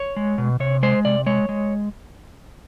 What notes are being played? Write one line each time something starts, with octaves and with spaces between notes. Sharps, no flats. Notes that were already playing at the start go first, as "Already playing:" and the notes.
Already playing: C#5
G#3
B2
C3 C#5
G#3 C5
C3 D5
G#3 C#5
G#3